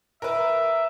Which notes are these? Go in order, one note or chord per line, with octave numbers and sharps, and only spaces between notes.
A#4 B4 E5